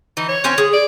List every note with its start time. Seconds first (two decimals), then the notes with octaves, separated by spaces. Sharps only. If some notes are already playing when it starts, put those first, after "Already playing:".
0.17 E3 D#4
0.29 C#5
0.44 C4 C#4 G#5
0.58 G#4
0.73 D5